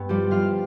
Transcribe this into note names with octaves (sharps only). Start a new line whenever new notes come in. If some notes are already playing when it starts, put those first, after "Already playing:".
Already playing: G2 B3
F3 G3 G4
F3 F4 F5